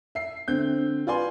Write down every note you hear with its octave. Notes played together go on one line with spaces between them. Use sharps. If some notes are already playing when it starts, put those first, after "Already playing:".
E5 C7
D3 C4 G6
F4 B4 D5 G#5 C6